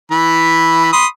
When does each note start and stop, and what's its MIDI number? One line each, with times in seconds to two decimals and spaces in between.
0.11 0.90 52
0.11 0.90 83
0.93 1.06 83
0.93 1.06 84
0.93 1.06 87